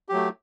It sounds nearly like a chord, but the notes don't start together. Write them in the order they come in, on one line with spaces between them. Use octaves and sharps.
G4 F#3 A3